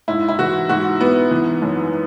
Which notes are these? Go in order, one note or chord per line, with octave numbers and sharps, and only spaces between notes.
G#2 E4
E4
E3 F#4
G#2 F#4
G#2 B3
E3
F#2